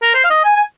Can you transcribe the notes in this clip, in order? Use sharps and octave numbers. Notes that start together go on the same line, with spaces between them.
A#4
C5
F5
D#5
G#5
G#5